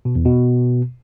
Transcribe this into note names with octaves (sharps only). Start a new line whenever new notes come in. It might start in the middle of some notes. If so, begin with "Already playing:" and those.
B2
E2
B2